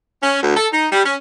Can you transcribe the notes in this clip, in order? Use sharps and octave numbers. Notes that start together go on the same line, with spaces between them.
C#4
D2
A4
D#4
G3
C#4